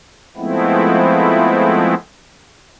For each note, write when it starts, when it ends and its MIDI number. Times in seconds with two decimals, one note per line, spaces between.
0.37 1.94 53
0.37 1.94 56
0.37 1.94 57
0.37 1.94 59
0.37 1.94 60
0.37 1.94 64